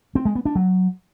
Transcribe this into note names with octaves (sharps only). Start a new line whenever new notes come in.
C4
G#3
B3
D4
F#3